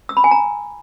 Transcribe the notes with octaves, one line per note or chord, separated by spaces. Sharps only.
E6
B5
G#5
A#5